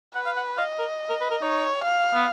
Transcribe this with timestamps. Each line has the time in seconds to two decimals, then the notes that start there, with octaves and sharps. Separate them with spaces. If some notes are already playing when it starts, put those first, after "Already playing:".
0.15 B4 F#5
0.26 F5
0.36 F#5
0.57 D#5 F5
0.79 A#4
1.10 A#4
1.21 B4
1.31 A#4
1.42 D#4 C#5
1.85 F5
2.14 B3